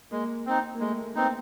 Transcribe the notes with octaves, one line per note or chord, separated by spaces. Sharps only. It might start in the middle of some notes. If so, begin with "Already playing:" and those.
G#3 A#3
C4 D#4
A#3
G#3 A3
A#3
B3 C4 D#4